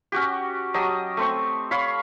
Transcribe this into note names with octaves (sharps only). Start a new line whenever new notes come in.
C#4 F#4 G4
F#3 G4 D#5 A5
A3 C4 C#6
C#5 F5 B5